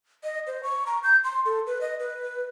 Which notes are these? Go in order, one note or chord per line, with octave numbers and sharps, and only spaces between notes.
D#5
C5
C#6
A#5
G6
C6
A4
B4
D#5
B4